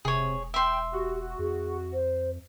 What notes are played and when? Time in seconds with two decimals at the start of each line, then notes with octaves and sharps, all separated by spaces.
0.05 E1 C3 G#4 C#5
0.54 E5 G5 C6
0.93 F#4 G4
1.39 F2 G#4
1.93 C5